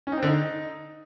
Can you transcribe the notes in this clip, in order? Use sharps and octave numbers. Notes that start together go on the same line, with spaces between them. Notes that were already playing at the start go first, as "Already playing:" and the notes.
C#4
D#4
C4
D3
D#4